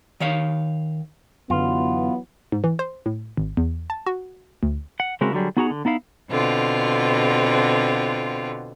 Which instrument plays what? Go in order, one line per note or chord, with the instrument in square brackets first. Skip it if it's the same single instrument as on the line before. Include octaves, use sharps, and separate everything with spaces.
[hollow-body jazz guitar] D#3 C#5 F5
[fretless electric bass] F#2 D3 [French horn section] E3 F#3 B3 [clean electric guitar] F4
[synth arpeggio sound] G#2
E3
C5
A2
G#1
E2
A5
F#4
D2
[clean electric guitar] F#5
C#3 G#3 C4 E4 F#4 A#4
D3 F#3 G3 G#4
B3 D#4 F#4 G#4 F#5 A#5
D3
B3 D#4 E4 F5
[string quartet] B2 D3 C4 F4